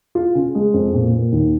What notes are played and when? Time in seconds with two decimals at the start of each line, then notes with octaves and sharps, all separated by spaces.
0.15 F4
0.35 C#3
0.55 G#3
0.74 F2
0.94 A#2
1.12 A#3
1.32 D#2